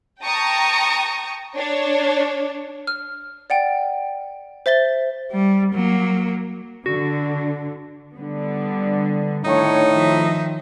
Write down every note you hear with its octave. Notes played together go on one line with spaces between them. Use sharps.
G5 A5 A#5 C#6 D#6
D4 C#5
F6
D5 F#5 G5
C5 E5 A6 G7
G3
F#3 A#3
D3 F#4
D3 G3 B3
A2 D#3 D4 D#4 C#5
D#3 F3 E5